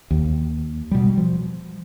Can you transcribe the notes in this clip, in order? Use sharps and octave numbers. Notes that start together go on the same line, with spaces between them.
D#2
B2 G3
F3